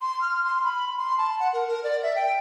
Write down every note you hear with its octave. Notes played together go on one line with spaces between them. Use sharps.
C6
F6
C6
B5
C6
A5
F#5
A#4
A#4
D5
E5
G5